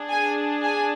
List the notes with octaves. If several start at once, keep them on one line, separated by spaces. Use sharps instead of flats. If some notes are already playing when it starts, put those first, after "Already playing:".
Already playing: D4 G#4
G#5
G#5